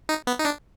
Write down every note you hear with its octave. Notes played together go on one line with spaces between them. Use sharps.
D#4
B3
D#4
D4